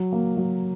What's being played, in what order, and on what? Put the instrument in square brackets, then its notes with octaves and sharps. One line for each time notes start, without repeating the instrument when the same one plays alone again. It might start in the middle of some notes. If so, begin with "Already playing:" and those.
Already playing: [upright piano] F#3
A#3
F#3